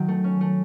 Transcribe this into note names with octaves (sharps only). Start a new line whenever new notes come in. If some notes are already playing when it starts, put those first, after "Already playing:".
Already playing: D#3 F#3
A3
C#4
A3